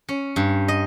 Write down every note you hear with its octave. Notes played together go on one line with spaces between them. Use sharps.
C#4
G2
D#5